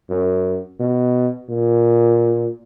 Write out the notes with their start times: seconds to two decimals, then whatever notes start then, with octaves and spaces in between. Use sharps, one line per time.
0.10 F#2
0.80 B2
1.49 A#2